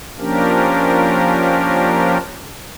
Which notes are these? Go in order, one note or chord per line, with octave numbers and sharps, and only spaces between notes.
F3 A#3 C#4 D4 G4 A#4